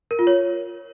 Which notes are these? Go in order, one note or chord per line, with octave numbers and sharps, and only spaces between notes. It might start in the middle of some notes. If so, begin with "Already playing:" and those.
A#4
F4
C#5